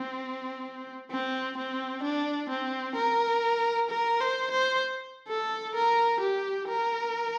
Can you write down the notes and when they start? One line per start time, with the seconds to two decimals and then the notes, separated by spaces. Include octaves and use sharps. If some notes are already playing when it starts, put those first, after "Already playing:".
Already playing: C4
1.11 C4
1.57 C4
2.03 D4
2.49 C4
2.96 A#4
3.89 A#4
4.20 C5
4.51 C5
5.28 A4
5.75 A#4
6.21 G4
6.68 A#4